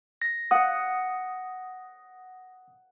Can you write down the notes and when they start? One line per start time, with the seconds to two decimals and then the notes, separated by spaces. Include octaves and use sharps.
0.22 A#6
0.51 F#5 D#6